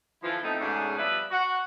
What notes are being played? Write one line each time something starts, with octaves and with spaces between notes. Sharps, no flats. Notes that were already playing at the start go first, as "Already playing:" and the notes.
D3 E3 F3 E4 F4
F3 A3 B3 C4 D#4
G#2 B2 A3 C#4 D4 G#4
F3 G3 B3 B4 D5 E5
F#4 F#5